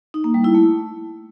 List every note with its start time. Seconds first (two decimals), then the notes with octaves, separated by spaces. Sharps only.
0.14 D#4
0.24 A#3
0.34 G3
0.44 E4
0.54 A3